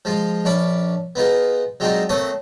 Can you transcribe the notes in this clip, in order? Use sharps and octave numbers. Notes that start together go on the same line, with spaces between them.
F3 G#3 F4
A#1 C#4 D4 B5 D6
B3 D#4 F4 G#4
F#3 G#3 C4 D4 D#4 F4
A#2 A3 C4 C#5 D#6